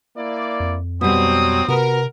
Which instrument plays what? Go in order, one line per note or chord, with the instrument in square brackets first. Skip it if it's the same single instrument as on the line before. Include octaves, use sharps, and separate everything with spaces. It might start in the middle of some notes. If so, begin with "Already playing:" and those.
[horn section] A#3 E4 D5
[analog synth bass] F2
[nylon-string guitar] B2 G3 [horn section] F#3 C4 [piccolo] D#6
[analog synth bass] C3 [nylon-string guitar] F#4 B4 [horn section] A#4